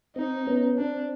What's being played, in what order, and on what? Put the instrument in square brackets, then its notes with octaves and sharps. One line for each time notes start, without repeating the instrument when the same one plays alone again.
[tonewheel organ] C4 [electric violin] D#4
[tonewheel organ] B3 C#4
[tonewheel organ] C4 [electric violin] D4